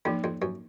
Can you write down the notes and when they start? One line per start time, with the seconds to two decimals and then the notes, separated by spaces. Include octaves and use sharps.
0.05 F2 F3 A#3 D#4
0.24 F2
0.42 F#2